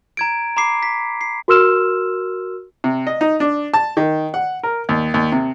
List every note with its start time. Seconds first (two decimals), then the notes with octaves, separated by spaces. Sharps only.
0.17 A#5 G#6 D7
0.57 A#5 B5 D6 C7
0.83 B6
1.21 C7
1.48 F#4 A#4 C6 E6 F6 E7
2.84 C3
3.07 D#5
3.21 D#4
3.40 D4
3.74 A5
3.97 D#3
4.34 F#5
4.63 A#4
4.89 D#2
5.14 D#2
5.32 C3